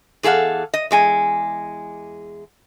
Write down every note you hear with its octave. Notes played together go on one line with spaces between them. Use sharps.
E2 G#4 A4 F5 F#5
D#5
E2 G#3 G#5